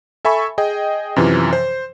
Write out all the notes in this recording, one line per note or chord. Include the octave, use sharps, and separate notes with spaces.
A4 E5 G#5 B5 C#6
G#4 D#5 G5
F#2 C3 E3 F3
C5